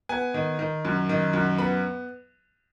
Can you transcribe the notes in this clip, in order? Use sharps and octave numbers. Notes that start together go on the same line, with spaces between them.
B3 G#5
D#3
D#3
F#2
D#3
F#2
B3 B5